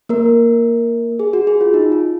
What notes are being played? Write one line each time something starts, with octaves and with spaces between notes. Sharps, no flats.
A#3 A#4
G#4
F#4
G#4
F4
D#4
F4